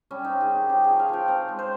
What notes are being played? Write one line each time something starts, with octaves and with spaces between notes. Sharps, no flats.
G3 C#4
C4 D#4
G#4
D#3
G4
C#4 G4
F3 G#4
F5
F3 G5
C4 A#5
G#3
C5